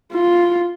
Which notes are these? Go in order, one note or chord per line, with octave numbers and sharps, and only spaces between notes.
F4